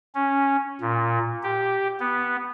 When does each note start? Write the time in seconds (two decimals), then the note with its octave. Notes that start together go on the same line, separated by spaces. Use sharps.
0.15 C#4
0.81 A#2
1.43 G4
2.00 B3